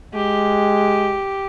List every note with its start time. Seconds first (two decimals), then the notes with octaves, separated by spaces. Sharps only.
0.15 G#3 G4